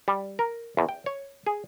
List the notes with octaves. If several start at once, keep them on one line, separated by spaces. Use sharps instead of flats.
G3
A#4
E2
G5
C#5
G#4